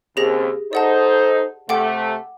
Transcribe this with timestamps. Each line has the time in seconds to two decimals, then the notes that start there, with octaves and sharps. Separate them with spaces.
0.17 D#2 C#3 C4 G4 G#4 A#6
0.73 D#4 A4 C5 D5 F#5 A5
1.69 C3 A3 F#5 G5 D6